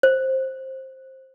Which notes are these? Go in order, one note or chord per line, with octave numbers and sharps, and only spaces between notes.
C5